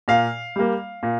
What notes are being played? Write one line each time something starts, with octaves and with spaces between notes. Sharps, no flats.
A#2 F5
G3 A#3
A#2